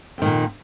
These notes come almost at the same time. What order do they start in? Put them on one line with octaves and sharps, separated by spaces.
F2 D#3 A#2